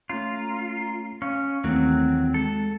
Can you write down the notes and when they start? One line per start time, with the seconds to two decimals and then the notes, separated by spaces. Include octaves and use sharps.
0.09 A3 C#4 F4 A#5
1.22 C#4 F5
1.64 D#2 D#3 E3 F#3 A3 C4
2.34 G#3 A4